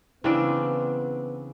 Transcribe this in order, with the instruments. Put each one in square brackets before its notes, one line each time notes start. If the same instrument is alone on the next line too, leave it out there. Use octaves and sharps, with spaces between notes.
[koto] C#3 D4 [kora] E3 C4 [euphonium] B3